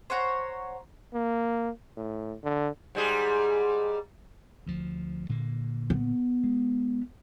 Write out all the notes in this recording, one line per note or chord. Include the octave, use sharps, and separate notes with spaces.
C5 C#5 F#5 A#5
A#3
A2
D3
G#2 G3 G#4
D2 F3
A#2 D3 A#3
B3
G#3